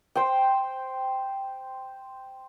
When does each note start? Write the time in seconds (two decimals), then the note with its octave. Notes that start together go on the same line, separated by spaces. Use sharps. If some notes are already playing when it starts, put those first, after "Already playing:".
0.15 C5 G5